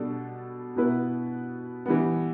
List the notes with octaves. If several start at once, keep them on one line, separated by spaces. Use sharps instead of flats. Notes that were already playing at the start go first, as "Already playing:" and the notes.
Already playing: B2 G3 D4 A4
B2 B3 E4 B4
E3 G3 B3